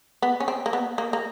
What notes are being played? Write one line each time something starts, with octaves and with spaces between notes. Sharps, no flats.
B3
C#4
C4
A#3
B3
A#3
A#3